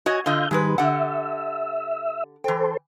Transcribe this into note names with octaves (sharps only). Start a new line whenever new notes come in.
F#4 C#5 D#5 G#5
D3 F4 D#5 F5 G6
G#2 D#3 G3 G#3 B4
D3 G4 E5 F#5
E3 A4 C5 G5